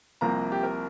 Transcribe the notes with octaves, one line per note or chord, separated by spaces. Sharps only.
C2 C3 F3 A#3 A#5
G4
A#4